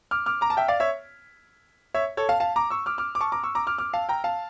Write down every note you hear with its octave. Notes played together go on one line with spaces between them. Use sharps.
D6 F6
D6 F6
A#5 D6
A5
E5 G5
D5 F5
C#5 E5
C#5 E5
A4 C#5
F5 A5
F5 A5
A#5 D6
C#6 E6
D6 F6
D6 F6
D6
A5 C#6
A#5 D6
C#6 E6
A#5 D6
D6 F6
D6 F6
F5 A5
G5 A#5
F5 A5